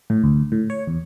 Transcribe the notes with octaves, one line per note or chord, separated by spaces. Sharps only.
A2
D2
A2
C#5
E2